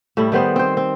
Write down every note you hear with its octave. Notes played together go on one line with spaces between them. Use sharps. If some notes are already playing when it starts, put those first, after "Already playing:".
A2 G3 E4
D#3 G3 B3 C5
C4 C5
C4